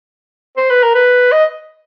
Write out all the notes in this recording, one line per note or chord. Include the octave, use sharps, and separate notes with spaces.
C5
B4
A#4
B4
D#5